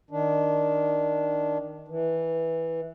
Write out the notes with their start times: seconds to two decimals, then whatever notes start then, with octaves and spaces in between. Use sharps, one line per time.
0.11 D#3 D4
1.88 E3